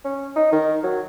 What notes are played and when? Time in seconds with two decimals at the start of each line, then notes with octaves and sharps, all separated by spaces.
0.05 C#4
0.36 D#4
0.52 D#3
0.84 F#3